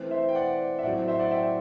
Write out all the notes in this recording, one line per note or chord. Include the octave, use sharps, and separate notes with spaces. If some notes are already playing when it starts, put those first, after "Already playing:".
Already playing: E3 A3 C4
C5 E5
G5
D5 F#5
E5
A2 F#3 C4 D5 F#5
C5 E5
D5 F#5
E5 G5